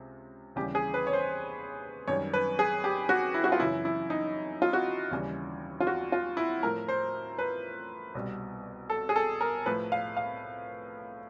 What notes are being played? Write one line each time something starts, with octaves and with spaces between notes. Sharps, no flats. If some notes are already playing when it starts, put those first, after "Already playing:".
Already playing: C#2 C3
D#2 C#3 E3 G3 G4
G#4
B4
C#5
C5
F#2 D#3 G3 C#5
B4
G#4
G4
F#4
E4
F#4
F4
F#2 C#3 E3 E4
E4
D#4
F4
F#4
D#2 C#3 E3 G3
F4
F#4
F4
E4
A2 F3 A#4
C5
B4
C2 B2 G3
A4
G#4
A4
A#4
A2 F3 B4
F5
F5